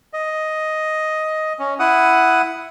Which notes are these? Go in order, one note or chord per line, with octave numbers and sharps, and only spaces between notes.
D#5
C#4
E4 F#5 D#6